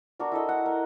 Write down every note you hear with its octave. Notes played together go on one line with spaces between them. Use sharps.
D4 F#4 A#4 D5
E4 A4 D#5
F#5
A#4